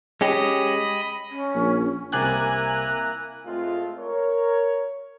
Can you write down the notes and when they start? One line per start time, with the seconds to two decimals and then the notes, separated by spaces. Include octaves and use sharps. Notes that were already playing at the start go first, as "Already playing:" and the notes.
0.21 G#3 C#4 G4 D#5 B5
1.30 C#4
1.55 A#1
2.12 C2 A#3 E4 D5 G5 G#5 A#5 F#6
3.45 A2 G#3 A3 C4 F4
3.98 A#4 C#5